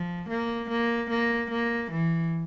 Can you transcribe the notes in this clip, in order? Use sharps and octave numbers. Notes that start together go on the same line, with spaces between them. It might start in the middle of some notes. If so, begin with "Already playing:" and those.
Already playing: F3
A#3
A#3
A#3
A#3
E3